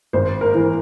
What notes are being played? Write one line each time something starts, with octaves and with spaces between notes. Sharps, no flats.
G#1 C5
A#4
E3